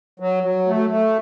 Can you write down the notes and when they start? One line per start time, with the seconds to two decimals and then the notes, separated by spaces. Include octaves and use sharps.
0.20 F#3
0.43 F#3
0.67 A3
0.89 A3